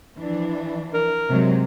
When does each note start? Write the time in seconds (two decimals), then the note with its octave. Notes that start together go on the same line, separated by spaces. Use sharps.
0.17 E3 F3 D4
0.94 A#4
1.29 C3 F#3 G#3